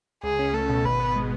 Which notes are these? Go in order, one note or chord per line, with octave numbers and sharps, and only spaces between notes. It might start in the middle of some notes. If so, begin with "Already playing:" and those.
C#2 G#4
C#4
A3 A4
B2
G#1 B4
B3
G#3